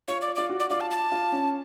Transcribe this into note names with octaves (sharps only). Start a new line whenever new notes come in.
F4 C#5
D5
F4 D5
F#4
D5
F4 D5
A5
A5
F4
C#4